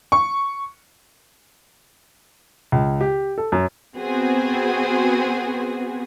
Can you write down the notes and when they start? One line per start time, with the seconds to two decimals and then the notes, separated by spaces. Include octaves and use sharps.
0.12 C#6
2.72 C#2
3.01 G4
3.38 A4
3.52 F#2
3.97 B3 C4 F#4 G#4